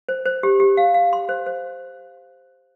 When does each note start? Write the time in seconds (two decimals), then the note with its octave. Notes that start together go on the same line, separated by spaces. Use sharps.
0.09 C5
0.26 C5
0.43 G4
0.60 G4
0.77 F5
0.94 F5
1.13 C6
1.29 C5
1.46 C5